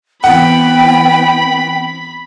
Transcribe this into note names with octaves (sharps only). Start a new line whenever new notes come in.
E3 B3 C4 F#5 G5 B5